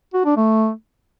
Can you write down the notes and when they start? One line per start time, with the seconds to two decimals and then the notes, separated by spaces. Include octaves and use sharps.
0.14 F#4
0.25 D4
0.37 A3